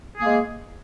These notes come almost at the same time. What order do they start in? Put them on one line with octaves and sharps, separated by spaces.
G#4 A#3 G#3